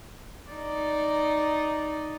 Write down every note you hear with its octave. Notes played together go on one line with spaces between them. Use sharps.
D#4 D5